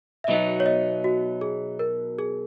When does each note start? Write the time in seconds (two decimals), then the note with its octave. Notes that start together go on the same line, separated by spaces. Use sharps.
0.24 E5
0.28 B2 F#3 B3 D#4 D#5
0.60 C#5
0.66 D#5
1.04 F#4
1.41 G#4
1.79 A#4
2.19 G#4